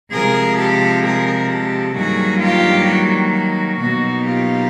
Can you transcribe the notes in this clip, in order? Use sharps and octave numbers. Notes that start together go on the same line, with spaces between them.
C3 F3 G#3 G#4 A#4
G4 A4
G#4 A#4
G4 A4
G2 D#3 F#3 A#3 F#4 G#4
F4 G4
F#4
F#4
B2 F#3 A#3 D#4 F#4
F4 G4